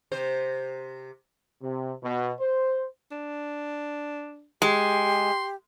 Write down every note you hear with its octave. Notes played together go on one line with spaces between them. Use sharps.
C3 C5
C3
B2
C5
D4
G#3 G4 C6